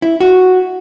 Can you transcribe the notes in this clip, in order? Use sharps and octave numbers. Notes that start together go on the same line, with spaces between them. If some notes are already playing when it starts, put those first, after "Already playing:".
E4
F#4